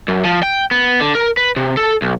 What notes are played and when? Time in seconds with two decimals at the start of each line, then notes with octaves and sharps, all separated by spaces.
0.08 F#2
0.24 F3
0.43 G5
0.71 B3
1.01 D3
1.15 A#4
1.37 B4
1.56 C3
1.77 A4
2.02 B1